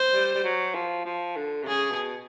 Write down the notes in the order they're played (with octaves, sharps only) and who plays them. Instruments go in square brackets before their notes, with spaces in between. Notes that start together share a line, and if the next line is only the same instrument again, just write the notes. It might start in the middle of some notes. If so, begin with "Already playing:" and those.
Already playing: [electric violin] C5
[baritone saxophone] G3
G3
F#3
F3
F3
D3
C3
[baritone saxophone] C#3 [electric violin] G#4
[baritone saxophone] B2